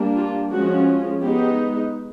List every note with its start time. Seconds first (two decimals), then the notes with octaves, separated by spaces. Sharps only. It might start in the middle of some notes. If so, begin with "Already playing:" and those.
Already playing: G3 A#3 D4
0.16 F4
0.51 F3 G#3 C#4 F4 F#4
1.21 G#3 B3 D#4 G4